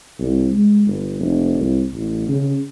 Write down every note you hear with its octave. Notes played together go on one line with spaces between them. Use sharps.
C2
G#3
G1
F1
C2
A1
C#3